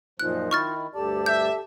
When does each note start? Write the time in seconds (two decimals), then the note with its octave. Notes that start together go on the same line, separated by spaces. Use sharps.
0.20 F#2 A#2 F3 D#4 F4 F#6
0.51 D#3 E4 C#6 F6 A6
0.94 D2 G2 G4 A4 D5 A5
1.26 E5 G6